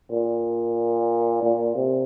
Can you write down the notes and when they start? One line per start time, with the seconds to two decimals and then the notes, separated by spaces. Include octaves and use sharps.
0.11 A#2
1.42 A#2
1.75 C3